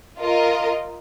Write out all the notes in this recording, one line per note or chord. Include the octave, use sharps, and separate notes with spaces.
F4 A#4 D#5